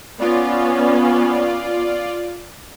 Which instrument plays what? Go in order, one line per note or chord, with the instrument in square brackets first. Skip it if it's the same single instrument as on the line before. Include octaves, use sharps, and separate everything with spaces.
[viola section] B3 C#4 [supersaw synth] F4 D5